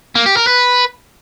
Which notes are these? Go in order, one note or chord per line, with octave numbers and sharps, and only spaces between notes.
A#3
G4
A#4
B4